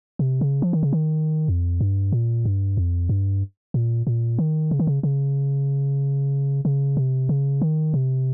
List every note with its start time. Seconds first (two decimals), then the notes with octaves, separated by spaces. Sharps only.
0.19 C3
0.41 C#3
0.62 F3
0.73 D#3
0.83 C#3
0.93 D#3
1.48 F2
1.81 G2
2.12 A#2
2.45 G2
2.77 F2
3.09 G2
3.74 A#2
4.07 A#2
4.39 D#3
4.71 C#3
4.80 D#3
4.87 C#3
5.03 C#3
6.65 C#3
6.97 C3
7.29 C#3
7.62 D#3
7.94 C3